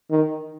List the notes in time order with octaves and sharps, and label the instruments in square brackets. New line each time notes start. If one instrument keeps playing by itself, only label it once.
[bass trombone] D#3